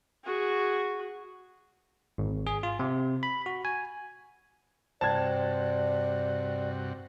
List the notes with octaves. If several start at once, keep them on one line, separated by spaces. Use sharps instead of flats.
F#4 G#4
G#1
G#4
F4
C3
B5
F#4
G#5
G2 C3 F#4 C5 D5 G5 A5 G#6